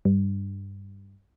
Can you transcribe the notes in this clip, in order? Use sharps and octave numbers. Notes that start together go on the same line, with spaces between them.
G2